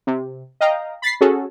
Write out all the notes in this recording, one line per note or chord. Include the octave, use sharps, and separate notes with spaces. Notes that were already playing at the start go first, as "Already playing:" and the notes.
C3
D#5 F5 G5 A#5
B5 A6 B6 C7
C#4 F#4 G#4 A4